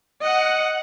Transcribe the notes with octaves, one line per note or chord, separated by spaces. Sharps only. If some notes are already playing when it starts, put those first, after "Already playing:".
D#5 F#5